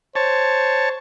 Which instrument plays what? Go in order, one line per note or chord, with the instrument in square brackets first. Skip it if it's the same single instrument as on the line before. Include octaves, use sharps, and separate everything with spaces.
[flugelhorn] C5 [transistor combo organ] C#5 A5